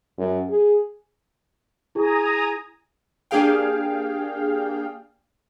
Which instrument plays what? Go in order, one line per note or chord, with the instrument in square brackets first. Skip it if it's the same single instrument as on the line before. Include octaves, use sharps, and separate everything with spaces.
[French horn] F#2
G#4
[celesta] E4 G#4 [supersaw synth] G#5 A#5 D#6
[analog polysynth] A#3 D4 G4 G#4 F5 G5